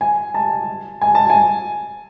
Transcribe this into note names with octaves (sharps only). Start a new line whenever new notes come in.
G#5
A5
G#5
A5
G#5